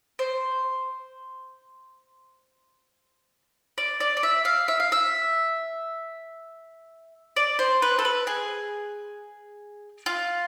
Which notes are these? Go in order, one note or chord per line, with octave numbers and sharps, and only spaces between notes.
C5
D5
D5
D5
E5
F5
E5
F5
E5
D5
C5
B4
A4
B4
G#4
F4